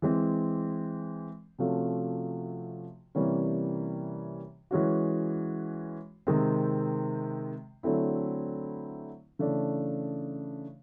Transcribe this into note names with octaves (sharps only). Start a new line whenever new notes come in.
E3 G#3 C4
C3 F3 A3 C#4 F#4
C3 E3 G3 A#3 C#4
E3 G#3 C#4 F#4
C3 D#3 G#3 C4
D3 F#3 A3 C4 E4
C#3 E3 A3 D4